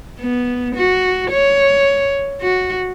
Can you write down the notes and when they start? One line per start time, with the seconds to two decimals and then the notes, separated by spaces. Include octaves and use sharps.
0.20 B3
0.76 F#4
1.31 C#5
2.42 F#4